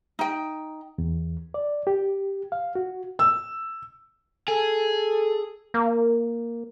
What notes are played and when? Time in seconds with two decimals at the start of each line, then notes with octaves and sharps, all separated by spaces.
0.19 D#4 G5
0.98 E2
1.54 D5
1.87 G4
2.52 F5
2.75 F#4
3.19 E6
4.48 G#4 A4
5.74 A#3